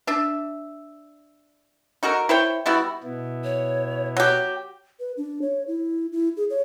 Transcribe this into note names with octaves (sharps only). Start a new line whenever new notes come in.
D4 E5
D#4 F#4 A4 A#4
E4 C5 C#5 G5
G3 B3 E4 F#4
B2 B3 E4
C#5
F#3 F#4 G4
B4
D4
C#5
E4
E4
G#4
C#5